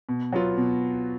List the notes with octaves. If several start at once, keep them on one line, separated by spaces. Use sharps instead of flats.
B2
F#3 B3 F4
B2